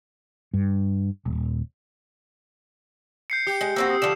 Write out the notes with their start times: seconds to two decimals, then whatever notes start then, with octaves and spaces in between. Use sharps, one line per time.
0.54 G2
1.26 D#1
3.30 G6 C7 C#7
3.47 G4
3.61 G#3
3.76 A#3 C4 F#4 E6
3.90 D#6
4.02 D3 F3 E7